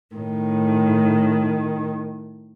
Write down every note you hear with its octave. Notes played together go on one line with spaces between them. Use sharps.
A2 D#3